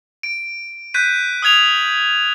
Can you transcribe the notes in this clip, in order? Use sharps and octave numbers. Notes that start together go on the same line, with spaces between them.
D7
F#6 G6 B6 D#7
D#6 F6 G#6 F7